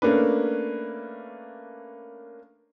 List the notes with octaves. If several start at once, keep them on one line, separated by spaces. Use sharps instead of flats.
A3 A#3 C#4 D4 B4